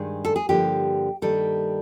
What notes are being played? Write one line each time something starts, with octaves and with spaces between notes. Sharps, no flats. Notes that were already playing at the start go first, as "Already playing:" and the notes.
Already playing: G2 D#3 G#3 G#4
A4
G#4
G2 D3 F3 A#3 G4
G2 D#3 G3 A#3 A4